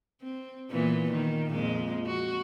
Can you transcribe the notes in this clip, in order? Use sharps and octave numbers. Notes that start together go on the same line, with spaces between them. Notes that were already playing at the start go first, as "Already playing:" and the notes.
C4
A#2 E3 B3
D#3
F2 A#2 G#3
F#4